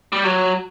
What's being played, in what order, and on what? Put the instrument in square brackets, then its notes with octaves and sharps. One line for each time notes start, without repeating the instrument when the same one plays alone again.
[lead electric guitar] G3
F#3